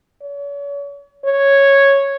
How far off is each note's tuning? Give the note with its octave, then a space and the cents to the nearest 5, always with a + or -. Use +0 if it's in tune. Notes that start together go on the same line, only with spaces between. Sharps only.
C#5 +40
C#5 -5